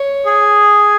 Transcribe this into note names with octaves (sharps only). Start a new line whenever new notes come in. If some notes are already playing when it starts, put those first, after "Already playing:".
Already playing: C#5
G#4